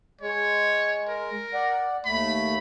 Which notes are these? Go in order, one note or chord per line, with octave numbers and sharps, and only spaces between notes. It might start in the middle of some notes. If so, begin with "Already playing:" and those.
G#3 C#5
A#4
D5 F#5
D#2 A3 B5